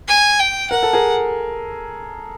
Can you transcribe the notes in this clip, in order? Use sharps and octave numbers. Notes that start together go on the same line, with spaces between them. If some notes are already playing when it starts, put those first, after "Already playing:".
G#5
G5
A#4 F#5
A4
G#4 A#4